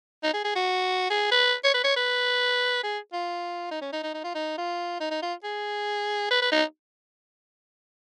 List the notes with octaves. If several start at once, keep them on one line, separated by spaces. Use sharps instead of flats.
D#4
G#4
G#4
F#4
G#4
B4
C#5
B4
C#5
B4
G#4
F4
D#4
C#4
D#4
D#4
D#4
F4
D#4
F4
D#4
D#4
F4
G#4
B4
B4
D#4